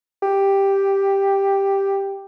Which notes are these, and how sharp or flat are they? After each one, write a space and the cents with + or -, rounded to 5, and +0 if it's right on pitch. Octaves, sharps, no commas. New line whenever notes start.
G4 +5